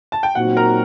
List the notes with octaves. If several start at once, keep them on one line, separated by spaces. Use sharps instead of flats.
A5
G5
A#2 F#3 C4 D#4 F#4 F#5
A#4 A#5